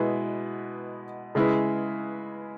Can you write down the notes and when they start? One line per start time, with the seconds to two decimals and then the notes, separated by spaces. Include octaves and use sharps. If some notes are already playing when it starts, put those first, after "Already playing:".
Already playing: B2 G#3 B3 E4
1.35 C#3 G#3 E4 B4